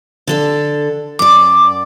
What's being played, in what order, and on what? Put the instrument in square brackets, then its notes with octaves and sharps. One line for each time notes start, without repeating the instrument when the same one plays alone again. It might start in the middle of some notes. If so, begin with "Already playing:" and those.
[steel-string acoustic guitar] D3 A4 D5
[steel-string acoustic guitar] F#2 D5 [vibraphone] D6